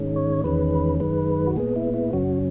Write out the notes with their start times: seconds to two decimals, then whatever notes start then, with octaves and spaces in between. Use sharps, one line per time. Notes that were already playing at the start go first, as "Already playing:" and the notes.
Already playing: G#2 D#3 G#3 C#4
0.16 C#5
0.44 E2 D#3 G#3 C#4 B4
1.00 F#2 D#3 G#3 B4
1.47 F#4
1.56 A#2 G#3 B3 G#4
1.76 E4
1.94 E4
2.13 F#2 C#3 F#3 C#4 F#4